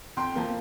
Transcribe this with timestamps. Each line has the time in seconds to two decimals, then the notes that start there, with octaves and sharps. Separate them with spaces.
0.17 F2 G5 C6
0.35 F3 A#3